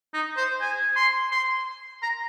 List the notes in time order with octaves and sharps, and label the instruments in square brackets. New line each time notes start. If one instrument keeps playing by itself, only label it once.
[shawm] D#4
C5
G#5
C6
C6
A#5